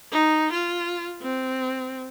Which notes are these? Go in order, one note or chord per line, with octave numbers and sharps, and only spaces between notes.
D#4
F4
C4